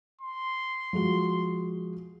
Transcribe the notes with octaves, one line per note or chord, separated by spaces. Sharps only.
C6
F3 G#3 F#4